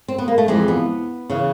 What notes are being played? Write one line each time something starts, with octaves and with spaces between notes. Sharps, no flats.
C4
B3
A#3
A3
F2 C3 E3 G#3
B3
C#3 E3